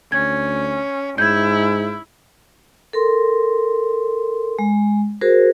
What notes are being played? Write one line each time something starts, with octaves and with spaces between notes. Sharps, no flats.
D2 C#4 G#6
G#2 E4 G6 G#6
A4 A#4 C6
G#3
F#4 G#4 A#4 C5